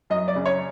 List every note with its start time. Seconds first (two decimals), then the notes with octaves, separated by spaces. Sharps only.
0.10 F#2 D#5
0.28 D5
0.36 C#3
0.46 C#5